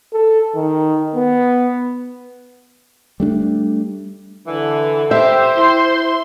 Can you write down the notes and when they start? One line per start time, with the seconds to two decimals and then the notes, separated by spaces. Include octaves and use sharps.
0.13 A4
0.55 D#3
1.15 B3
3.20 G3 A3 D4
4.48 D3 E3 A4
5.11 G4 C5 E5
5.56 E4 C6